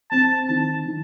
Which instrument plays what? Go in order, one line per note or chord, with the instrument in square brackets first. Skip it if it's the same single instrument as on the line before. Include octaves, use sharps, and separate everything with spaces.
[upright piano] C4 [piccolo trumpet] A5
[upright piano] D#3 [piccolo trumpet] A5
[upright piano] D#3